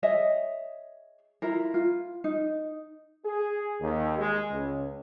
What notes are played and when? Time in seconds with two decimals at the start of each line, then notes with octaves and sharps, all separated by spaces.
0.03 G#4 C#5 D#5 E5
1.42 E4 F4 A#4
1.74 F4
2.24 D#4
3.25 G#4
3.81 D#2
4.19 G#3
4.51 C#2